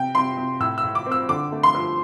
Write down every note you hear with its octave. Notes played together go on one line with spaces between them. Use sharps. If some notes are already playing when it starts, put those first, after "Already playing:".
Already playing: C3 G5
C3 C6
C3
A2 E6
E6
A2
D6
C4
E6
D3 D6
A3
C6
F3